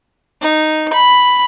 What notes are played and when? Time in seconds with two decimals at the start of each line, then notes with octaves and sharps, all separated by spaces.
0.42 D#4
0.93 B5